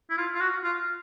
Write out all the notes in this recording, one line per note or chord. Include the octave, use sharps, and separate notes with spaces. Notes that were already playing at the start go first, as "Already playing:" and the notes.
E4
F4
F4
F#4
F4